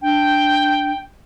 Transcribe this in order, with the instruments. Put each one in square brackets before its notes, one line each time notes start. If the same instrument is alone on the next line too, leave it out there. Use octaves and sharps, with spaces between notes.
[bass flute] D4 [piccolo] G5